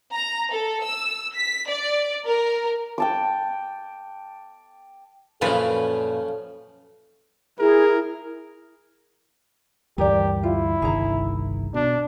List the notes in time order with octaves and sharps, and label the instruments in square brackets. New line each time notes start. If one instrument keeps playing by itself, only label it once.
[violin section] A#5
A4
E6
B6
D5
A#4
[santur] G5 A5 D6
[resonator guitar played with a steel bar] F#2 A#2 B4 [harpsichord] C#3 F3 [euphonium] A4
[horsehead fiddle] E4 [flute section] G#4 [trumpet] A#4
[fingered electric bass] D2 G2 E3 [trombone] G4 [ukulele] A#4 D5
[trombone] E4 [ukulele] F4
[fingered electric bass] G1 C2 D#3 [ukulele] G#4 A#5
[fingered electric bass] B2 [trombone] D4